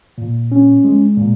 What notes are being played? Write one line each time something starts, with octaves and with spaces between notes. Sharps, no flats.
A#2
C#4
G#3
A#2